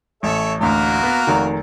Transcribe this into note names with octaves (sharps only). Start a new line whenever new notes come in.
A1 A4 C#5 E5
A1 D2 A#3 F#4 A#4
B3
F1 D#3